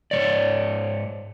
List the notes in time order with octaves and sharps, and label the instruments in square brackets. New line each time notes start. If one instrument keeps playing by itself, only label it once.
[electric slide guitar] G#2 E3 C#5 D5